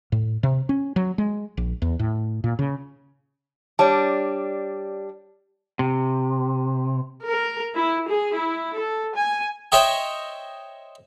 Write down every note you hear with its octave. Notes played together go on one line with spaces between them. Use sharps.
A2
C3
C#4
F#3
G#3
A#1
E2
A2
A#2
C#3
G3 D4 C#5 A5
C3
A#4
E4
G#4
E4
A4
G#5
C5 C#5 D#5 E5 G5